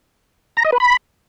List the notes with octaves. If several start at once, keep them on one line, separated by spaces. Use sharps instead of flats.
A#5
D#5
B4
B5